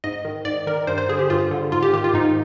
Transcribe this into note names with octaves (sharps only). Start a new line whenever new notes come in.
G#2 D#5
D#3
G#2 D5
D#3 A#4
G2 C5
C5
D3 G#4
G4
G2 F4
D3
G#2 F4
G4
D#3 G4
F4
G#2 D#4